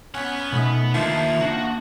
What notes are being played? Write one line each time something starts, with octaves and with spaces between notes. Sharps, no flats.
C#4 B4 F#5
B2 A3 D#4
D#3 F3 A#3 D4 A#4 E5
A#3 D4 F#4